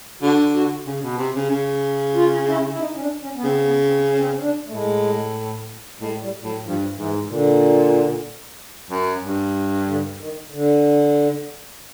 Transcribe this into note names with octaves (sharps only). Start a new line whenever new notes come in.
D3 F#4
F#4
C#3
B2
C3
C#3
C#3
F4
E4
E4
D#4
C#4
D4
C#4
B3
C#3 C4
B3
C4
C#4
C4
C#4
D4
A3
A2 G#3
A2 G#3
G3
A2 F#3
G2 F3
G#2 E3
A#2 D3
F#2
G2
D3
D#3
D3